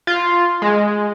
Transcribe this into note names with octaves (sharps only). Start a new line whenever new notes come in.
F4
G#3